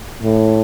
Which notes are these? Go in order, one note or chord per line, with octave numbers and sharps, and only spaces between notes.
A2